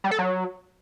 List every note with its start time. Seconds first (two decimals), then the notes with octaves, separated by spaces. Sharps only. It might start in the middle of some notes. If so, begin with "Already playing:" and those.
0.04 G3
0.11 A4
0.19 F#3